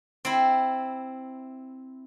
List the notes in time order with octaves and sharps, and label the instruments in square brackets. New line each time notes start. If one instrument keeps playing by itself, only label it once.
[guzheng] C4 E4